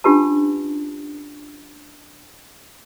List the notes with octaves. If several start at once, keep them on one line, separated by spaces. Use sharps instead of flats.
C#4 D4 F4 G4 B4 A5